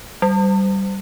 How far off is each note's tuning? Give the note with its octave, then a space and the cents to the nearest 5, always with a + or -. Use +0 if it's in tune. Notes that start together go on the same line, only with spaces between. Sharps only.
G3 -15